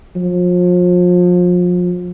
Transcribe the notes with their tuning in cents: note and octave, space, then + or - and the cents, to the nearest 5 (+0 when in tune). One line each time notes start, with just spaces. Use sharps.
F3 +35